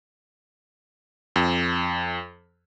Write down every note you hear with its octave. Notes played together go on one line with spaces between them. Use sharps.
F2